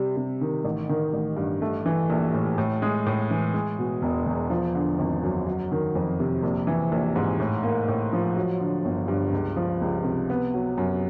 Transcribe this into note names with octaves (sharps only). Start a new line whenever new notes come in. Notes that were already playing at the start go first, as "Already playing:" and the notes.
Already playing: C3 G3
C3
D#3
A1
D#3
A1
G2
A3
E3
A#1
A2
A2
G#3
A2
E3
G#3
B2
E1
E2
F3
D3
G#1
F#2
F#3
D#3
F2
C3
A#1
E3
A#1
G#2
A2
A#3
A2
F3
F#3
D3
G1
G2
C#2
F3
C#2
C3
B3
F#3
F#2